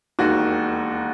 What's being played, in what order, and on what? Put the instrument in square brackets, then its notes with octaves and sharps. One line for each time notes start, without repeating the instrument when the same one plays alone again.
[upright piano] E1 D#2 D#3 F#4